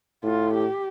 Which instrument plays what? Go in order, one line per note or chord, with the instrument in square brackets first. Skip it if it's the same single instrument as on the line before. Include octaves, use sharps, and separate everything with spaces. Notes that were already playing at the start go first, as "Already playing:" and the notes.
[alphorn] A2 [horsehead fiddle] F4
[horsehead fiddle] G4